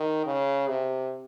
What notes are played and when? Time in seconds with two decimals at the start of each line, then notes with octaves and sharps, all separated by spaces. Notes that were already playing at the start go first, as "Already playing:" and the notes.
Already playing: D#3
0.26 C#3
0.68 C3